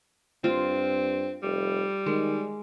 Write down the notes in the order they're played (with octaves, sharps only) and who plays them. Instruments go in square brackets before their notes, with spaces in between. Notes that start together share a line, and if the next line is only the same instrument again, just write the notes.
[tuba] G2 [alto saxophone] C4 [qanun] F4
[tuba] F1 [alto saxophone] G3
[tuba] D#3 [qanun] G#3